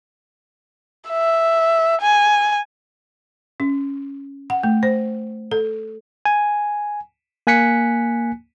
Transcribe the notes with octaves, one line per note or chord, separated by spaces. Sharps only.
E5
G#5
C#4
F#5
A3
C5
A4
G#5
A#3 G#5 F#6 B6 C#7